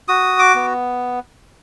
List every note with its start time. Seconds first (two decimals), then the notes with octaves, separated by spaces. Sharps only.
0.08 F#4 D#6
0.39 D6
0.55 B3